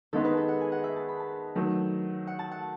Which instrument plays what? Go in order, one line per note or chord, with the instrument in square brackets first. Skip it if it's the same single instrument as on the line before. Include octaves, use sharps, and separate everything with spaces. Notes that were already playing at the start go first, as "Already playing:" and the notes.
[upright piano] D#3 G#3 B3 D#4 [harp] A4
[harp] B4
A4
F#5
G#5
F#5
E5
A5
B5
A5
[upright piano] D#3 F#3 A3
[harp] F#5
A5
F#5